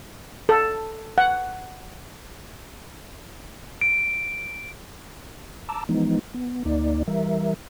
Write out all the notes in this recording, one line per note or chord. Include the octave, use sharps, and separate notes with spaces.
A4
F#5
D7
A5 A#5 D6 E6
E3 F3 G#3 B3 D#4
B3
D2 A#3 D#4 D5
E3 G3 A#4 E5